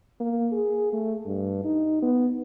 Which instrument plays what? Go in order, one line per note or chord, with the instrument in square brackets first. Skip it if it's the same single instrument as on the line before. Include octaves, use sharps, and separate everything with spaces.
[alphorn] A#3
G#4
A3
G2
D#4
B3